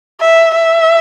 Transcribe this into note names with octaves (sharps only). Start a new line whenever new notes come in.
E5
E5